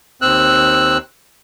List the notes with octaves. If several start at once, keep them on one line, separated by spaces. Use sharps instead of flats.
D#2 C4 E6 F#6